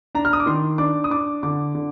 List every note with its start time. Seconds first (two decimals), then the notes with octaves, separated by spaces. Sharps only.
0.15 D4 A#5
0.25 F6
0.33 D#6
0.40 D6
0.46 D#3 C6
0.78 D4 D6
1.04 D#6
1.10 D4 D6
1.43 D3 D6
1.75 D3